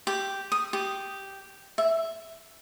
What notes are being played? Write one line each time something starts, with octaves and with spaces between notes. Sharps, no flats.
G4
D#6
G4
E5